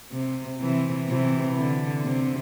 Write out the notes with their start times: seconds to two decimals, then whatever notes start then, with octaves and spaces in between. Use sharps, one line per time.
0.12 C3
0.61 C3 E3
1.09 C3 E3
1.57 D3
2.05 C3